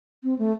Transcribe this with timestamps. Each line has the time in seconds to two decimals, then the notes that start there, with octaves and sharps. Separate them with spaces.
0.24 C4
0.39 A3